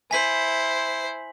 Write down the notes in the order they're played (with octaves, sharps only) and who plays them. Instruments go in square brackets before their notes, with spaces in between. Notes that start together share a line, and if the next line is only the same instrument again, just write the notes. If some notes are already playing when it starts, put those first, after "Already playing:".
[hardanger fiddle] E4 C5 [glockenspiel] G#5 B6 F#7